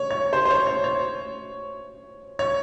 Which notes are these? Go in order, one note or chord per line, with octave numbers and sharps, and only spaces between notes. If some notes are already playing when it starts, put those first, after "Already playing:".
Already playing: C#5
C#5
C5
C5
C#5
C#5
C#5
C#5